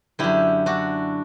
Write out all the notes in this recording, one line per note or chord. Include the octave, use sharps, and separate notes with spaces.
F#2 D3 E4 G4
D4 F#4